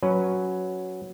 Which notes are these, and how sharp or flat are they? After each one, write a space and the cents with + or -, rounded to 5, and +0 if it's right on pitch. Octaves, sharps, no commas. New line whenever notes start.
F#3 +0 C#4 +0 B4 +0